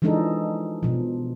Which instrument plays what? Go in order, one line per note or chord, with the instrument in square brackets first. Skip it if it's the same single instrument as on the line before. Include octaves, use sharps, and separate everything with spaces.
[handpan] E3 F3 G#3 D4 D#4 A4
B2 F3